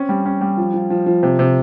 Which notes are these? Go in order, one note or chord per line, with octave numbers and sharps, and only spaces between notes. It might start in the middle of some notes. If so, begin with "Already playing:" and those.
Already playing: C4 C#4
G3
C#4
G3
F3
F3
F3
F3
C3
C3